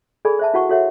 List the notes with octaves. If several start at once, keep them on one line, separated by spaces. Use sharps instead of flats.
G#4 A4 D5 G#5 B5
C5 E5 A5
E4 F#4 B4 F#5 A5 C#6
F#4 A4 C#5 E5 F#5